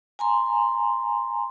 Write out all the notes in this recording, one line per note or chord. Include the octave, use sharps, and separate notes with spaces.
G#5 A#5 C6